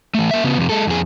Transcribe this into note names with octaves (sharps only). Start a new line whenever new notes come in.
E3 A3
A#3 E5
C#3 B3
F2 C3
G#3 A4
F2 G#4